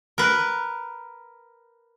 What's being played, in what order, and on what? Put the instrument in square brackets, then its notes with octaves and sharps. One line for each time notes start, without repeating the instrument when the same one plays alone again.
[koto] A#4 B4